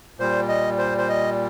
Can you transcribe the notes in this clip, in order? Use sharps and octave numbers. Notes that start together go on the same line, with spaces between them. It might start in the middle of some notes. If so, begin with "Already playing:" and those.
A#2 G3 C5
D#5
C5
C5
D#5